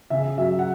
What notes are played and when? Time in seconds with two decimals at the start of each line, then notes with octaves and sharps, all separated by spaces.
0.10 C#3 E5
0.38 F#3 E5
0.59 F#5